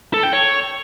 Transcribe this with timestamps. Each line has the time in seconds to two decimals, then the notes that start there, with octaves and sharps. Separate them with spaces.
0.14 A4
0.23 G5
0.33 C#5